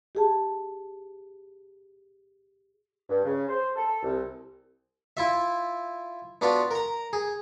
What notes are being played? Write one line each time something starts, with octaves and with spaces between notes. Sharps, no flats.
G4 G#4 A5
G2
C#3
C5
A4
C2
E4 F4 E5
B3 D4 F4 F#4 B4 F5
A#4 A#5
G#4